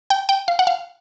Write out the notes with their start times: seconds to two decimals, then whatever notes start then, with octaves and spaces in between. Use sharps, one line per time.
0.10 G5
0.29 G5
0.48 F5
0.59 F#5
0.67 F5